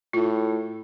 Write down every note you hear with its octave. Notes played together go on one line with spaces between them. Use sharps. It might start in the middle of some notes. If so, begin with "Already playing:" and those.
A2 F4